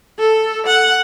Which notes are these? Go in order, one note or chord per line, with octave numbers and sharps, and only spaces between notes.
A4
F#5